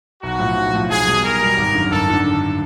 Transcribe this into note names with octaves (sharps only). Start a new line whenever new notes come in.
B1 F#4
A2 F3
B1
A2 F3
B1 G#4
B2 G3
B1 A#4
B2 G3
G#1
F#2 D3
G#1 A4
D3